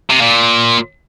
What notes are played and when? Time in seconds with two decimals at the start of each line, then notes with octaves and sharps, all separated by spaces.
0.10 C3
0.21 A#2